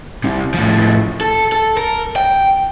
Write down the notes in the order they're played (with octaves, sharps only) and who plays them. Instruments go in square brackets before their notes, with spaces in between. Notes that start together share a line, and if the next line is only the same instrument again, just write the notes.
[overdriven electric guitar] C2 C3
A2 F3
A4
A4
A#4
G5